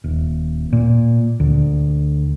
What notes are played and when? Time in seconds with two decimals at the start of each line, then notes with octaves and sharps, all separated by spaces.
0.04 D#1
0.73 A#2
1.40 D2